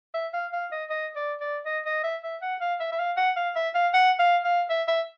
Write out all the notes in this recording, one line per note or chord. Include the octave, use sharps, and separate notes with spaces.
E5
F5
F5
D#5
D#5
D5
D5
D#5
D#5
E5
E5
F#5
F5
E5
E5
F5
F#5
F5
E5
F5
F#5
F5
F5
E5
E5